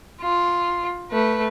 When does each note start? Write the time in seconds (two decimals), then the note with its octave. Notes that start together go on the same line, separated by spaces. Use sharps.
0.21 F4
1.11 A3 B4